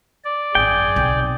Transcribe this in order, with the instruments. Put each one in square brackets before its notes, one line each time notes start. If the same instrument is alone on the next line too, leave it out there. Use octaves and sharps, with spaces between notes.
[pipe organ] D5
[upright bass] G#1 F#2 [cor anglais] G#4 [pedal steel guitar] G5
[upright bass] B1 C3